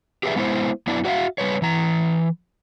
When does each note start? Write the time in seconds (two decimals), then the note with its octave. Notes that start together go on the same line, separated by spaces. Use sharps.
0.23 G4 G#4 B4 C#5 D5 E5
0.36 G#3 B3 E4 B4 C5
0.87 F#2 B3 D4 E4 D5
1.05 F#4 C#5 D5 E5 F5
1.38 G3 B4 C#5
1.62 E3 A#5